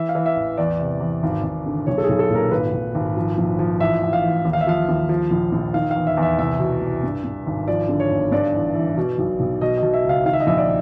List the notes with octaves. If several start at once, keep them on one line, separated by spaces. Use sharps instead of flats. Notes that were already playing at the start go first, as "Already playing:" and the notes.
Already playing: E3 E5
F5
E3
E5
A1
E2 D5
C3
E2
G#1
G#1
D3
B1 C#5
A4
G#4
B1
A4
A#2 A#4
G#1 B4
G#1
G#1
F3
A#1
F3
A1 E5
A1
F5
E3
D#2
F5
E5
F3 F5
D#2
F3
A#1
A#1
D#3 F5
E2 F5
E5
E2
E5
C2 E5
B2
C2
G2
G2
G#1
F3 D5
D3
C#5
G1
G2 D5
A1
E3
B2
B1
B1
B2 D#5
D#5
B2
E5
C#2
F5
D#3 F5
E5
D#5
A#1 E5
D5